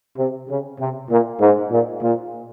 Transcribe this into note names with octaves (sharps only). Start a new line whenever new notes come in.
C3
C#3
C3
A#2
G#2
A#2
A#2